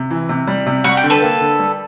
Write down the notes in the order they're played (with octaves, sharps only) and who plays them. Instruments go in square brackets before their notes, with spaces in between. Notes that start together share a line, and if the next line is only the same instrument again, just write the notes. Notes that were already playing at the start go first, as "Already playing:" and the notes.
Already playing: [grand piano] C3
E3
C3
G3
C3
[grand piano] G3 [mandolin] F#4
[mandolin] G4
[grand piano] D3
[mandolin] A4 B4
[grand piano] A#3
D3
G3